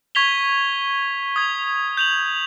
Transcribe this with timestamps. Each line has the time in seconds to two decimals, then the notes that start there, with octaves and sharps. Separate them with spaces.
0.15 C#6 G#6 B6 F7 G7
1.36 D#6 G#6
1.97 G6 F7 F#7